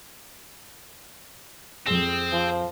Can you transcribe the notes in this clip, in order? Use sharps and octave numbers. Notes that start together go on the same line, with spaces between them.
F2 C4 G#4 E7
F3